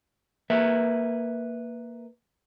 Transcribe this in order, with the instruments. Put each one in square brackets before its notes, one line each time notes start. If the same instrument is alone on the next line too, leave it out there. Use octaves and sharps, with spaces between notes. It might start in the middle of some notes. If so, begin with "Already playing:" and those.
[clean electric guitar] A#3 B4 E5